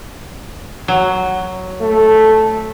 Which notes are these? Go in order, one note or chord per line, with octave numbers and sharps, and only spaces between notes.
F#3
A3